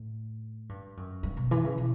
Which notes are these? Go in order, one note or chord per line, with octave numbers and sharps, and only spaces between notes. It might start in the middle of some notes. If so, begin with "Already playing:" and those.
Already playing: A2
G2
F#2
G2
B2
E3
C#3
B2